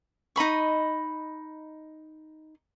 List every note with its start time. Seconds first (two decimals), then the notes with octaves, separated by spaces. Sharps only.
0.36 D#4 D#5 B5 C#6